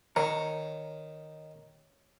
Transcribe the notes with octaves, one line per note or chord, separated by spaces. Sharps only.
D#3 C#5 A#5